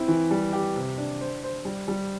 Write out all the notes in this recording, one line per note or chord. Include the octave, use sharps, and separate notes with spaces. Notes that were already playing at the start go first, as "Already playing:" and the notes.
Already playing: C4 E4
E3
G3
G4
C3
D4
C5
C5
G3
G3